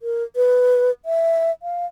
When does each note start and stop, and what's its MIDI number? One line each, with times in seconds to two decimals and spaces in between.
0.02 0.24 70
0.36 0.91 71
1.05 1.51 76
1.63 1.86 77